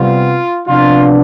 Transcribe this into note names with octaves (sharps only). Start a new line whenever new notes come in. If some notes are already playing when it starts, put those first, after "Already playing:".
Already playing: C3 G3 B3 F4
C3 F3 B3 D4 F4